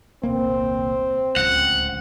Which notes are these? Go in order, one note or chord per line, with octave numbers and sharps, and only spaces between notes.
D#1 C2 A#3 C4
D1 G1 C#2 F#5